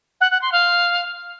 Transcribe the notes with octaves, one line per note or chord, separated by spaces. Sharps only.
F#5
F#5
C6
F5